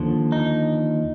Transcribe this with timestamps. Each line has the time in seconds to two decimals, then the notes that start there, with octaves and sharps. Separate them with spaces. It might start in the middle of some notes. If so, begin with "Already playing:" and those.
Already playing: D#2 D3 F3
0.32 D#4